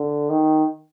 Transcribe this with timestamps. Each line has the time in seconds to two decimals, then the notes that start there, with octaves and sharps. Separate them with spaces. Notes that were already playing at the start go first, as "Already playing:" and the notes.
Already playing: D3
0.30 D#3